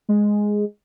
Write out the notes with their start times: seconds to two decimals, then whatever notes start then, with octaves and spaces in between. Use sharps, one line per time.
0.09 G#3